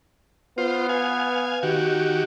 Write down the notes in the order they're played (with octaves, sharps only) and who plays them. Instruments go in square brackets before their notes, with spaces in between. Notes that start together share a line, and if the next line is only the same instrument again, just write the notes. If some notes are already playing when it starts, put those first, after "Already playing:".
[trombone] B3 [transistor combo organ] F4 C5
[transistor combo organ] F5 G#5
D#3 F#4 G4